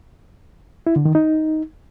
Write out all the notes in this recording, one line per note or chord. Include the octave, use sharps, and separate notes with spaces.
E4
D3
D#3
D#4